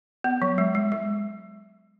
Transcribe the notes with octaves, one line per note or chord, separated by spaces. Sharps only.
B3
F#3
G#3
G#3
G#3